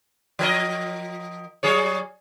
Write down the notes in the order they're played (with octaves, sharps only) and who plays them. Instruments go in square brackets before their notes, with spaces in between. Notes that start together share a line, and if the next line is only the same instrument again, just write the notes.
[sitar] F3 A#4 D#5
F#3 G#4 C#5